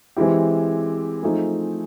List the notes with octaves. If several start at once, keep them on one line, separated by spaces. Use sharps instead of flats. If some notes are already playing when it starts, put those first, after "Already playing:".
E3 G#3 C4 E4 G4
F3 A3 C4 D#4 G#4